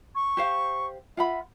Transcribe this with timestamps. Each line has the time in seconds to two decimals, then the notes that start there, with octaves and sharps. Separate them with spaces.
0.15 C#6
0.37 G4 C5 F5
1.17 F4 E5 F#5 B5